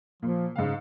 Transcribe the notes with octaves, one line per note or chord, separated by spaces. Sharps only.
A#2 F3
G#2 C#3 F5